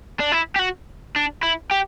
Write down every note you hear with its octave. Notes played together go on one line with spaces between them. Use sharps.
D4
E4
G4
F#4
D4
E4
G4